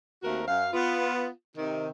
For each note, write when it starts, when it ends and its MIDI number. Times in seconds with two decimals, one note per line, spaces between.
0.23 0.43 39
0.23 0.43 57
0.23 0.43 60
0.23 0.43 66
0.23 0.43 70
0.47 0.68 42
0.47 0.68 77
0.73 1.29 59
0.73 1.29 65
1.58 1.88 48
1.58 1.88 51